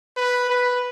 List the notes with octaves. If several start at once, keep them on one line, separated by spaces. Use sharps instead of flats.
B4
B4